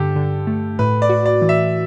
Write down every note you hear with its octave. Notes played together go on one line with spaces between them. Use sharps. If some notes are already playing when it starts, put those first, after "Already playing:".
Already playing: G2 D3 G4 A4
D3
A3
A2 B4
D5
F#4
D5
E3
E5